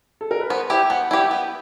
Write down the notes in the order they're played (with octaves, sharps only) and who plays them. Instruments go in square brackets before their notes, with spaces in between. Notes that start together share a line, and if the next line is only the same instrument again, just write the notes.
[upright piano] A4
A#4
B4
[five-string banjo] B3 [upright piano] C5
[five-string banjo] E4 G4 [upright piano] C5
[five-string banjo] B3 [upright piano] F#5
[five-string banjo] E4 G4 [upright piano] G5
[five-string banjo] B3